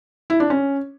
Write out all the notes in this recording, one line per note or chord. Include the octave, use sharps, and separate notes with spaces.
E4
D4
C#4